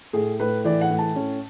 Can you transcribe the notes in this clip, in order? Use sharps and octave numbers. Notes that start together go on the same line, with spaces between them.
A2 G#4
A2 B4
E3 D5
F#5
A2
A5
C#4